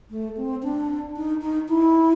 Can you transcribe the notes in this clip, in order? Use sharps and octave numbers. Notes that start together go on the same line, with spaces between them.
A3
C4
D4
D#4
D#4
E4